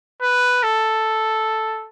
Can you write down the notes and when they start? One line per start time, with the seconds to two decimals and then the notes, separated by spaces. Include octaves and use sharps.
0.22 B4
0.63 A4